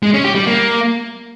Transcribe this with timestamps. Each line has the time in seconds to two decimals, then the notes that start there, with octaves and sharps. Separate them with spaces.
0.03 G#3
0.14 C#4
0.24 G4
0.35 G3
0.46 A#3